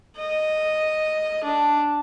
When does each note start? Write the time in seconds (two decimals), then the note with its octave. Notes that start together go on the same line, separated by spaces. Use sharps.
0.18 D#5
1.44 D4